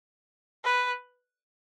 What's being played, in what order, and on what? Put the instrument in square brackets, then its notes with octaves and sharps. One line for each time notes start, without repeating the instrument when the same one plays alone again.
[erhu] B4